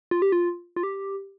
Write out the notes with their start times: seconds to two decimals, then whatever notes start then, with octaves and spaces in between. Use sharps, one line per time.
0.11 F4
0.22 G4
0.32 F4
0.76 F4
0.83 G4